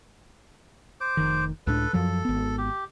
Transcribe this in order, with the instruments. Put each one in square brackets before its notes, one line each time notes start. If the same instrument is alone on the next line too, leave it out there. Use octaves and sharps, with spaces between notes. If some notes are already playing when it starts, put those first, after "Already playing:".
[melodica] C5 D6
[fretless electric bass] F1 D#3
[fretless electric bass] C#2 A2 D4 [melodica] A4 B4
[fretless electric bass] F#2 F3 F#3 [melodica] A4
[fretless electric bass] G#1 B3
[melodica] G4